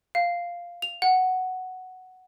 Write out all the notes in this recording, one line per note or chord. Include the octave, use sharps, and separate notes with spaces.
F5
F7
F#5